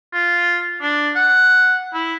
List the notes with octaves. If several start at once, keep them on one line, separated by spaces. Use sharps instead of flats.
F4
D4
F#5
E4